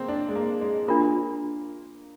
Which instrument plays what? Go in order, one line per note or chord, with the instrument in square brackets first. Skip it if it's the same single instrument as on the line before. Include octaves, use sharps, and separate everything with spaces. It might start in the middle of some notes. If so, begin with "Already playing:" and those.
Already playing: [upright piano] G#3 A#3 C4
D4
G#3
A#3
G#3
[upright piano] A#3 [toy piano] D4 F4 A#4